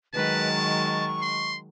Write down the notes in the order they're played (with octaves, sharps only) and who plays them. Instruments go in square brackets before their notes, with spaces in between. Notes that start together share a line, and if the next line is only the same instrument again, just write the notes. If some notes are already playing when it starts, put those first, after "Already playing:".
[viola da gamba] D#3 F#3 G#3 [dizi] B4 [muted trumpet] A5
[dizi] C#6
[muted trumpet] C6